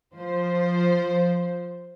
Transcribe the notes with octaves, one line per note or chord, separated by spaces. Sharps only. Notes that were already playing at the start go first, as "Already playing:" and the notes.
F3 C5